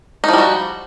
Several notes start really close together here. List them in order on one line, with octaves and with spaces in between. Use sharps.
D#4 F3 G3 F#4